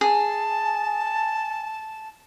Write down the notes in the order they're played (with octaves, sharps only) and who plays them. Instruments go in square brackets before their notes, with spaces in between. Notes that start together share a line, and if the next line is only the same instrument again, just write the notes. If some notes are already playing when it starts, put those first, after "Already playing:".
[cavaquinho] G#4 [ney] G#5 [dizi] A5